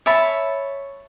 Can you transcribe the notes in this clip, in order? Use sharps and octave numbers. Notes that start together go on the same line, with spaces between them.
C#5 E5 A5 B5